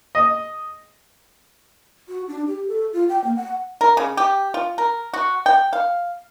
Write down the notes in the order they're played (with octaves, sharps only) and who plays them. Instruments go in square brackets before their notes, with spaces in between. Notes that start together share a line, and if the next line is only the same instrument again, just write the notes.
[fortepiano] D#5
[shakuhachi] F#4
D4
G4
A4
F4
G5
A#3
F#5
[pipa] A#4
C#3
G4
F4
A#4
F#4
G5
F5